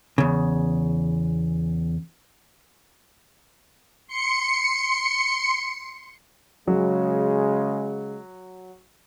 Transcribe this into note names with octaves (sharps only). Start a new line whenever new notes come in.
E2 C#3
C6 C#7
C#3 F#3 G#3